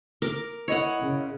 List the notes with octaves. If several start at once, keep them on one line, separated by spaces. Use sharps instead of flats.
A#4 D6
E4 C#5 D#5 F#5
C#3